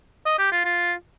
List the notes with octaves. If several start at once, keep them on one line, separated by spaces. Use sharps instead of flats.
D#5
G4
F4
F4